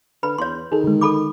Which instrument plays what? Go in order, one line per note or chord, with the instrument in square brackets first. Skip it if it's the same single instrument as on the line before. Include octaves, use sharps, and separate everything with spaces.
[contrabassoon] D3 [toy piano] B4 B5
[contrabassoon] E2 [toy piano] C#5 C6
[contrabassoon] D#3 [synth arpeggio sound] G#4 A4
[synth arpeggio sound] D3 G#3
[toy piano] A4 B5 D6